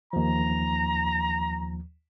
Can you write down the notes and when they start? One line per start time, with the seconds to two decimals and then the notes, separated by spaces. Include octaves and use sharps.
0.13 D#2 F3 A#5